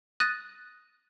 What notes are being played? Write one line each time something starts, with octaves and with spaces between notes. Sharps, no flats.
D#6 F#6 A6 A#6 D#7